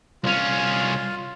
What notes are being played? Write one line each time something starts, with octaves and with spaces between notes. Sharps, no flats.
C2 C#4 F4